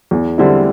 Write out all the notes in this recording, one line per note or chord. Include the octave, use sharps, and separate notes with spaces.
E2
D3 G3 C4 E4